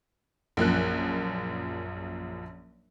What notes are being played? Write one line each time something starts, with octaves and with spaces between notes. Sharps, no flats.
A#1 F#2 F3 F#6